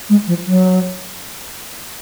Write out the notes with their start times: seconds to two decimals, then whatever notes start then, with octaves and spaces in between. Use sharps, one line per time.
0.09 G#3
0.27 F3
0.46 F#3